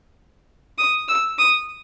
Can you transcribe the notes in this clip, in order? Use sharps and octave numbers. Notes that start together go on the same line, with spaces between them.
D#6
E6
D#6